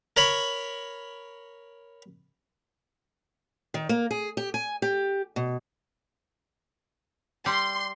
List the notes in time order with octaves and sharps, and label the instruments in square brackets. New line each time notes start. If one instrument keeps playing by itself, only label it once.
[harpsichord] A#4 C#5 B5
[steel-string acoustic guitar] D#3
A#3
G#4
G4
G#5
G4
B2
[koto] G3 [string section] C6